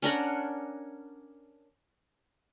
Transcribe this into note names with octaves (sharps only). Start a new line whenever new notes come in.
C#4 D4 A#4 F#5